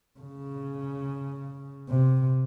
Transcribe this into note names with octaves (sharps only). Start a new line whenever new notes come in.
C#3
C3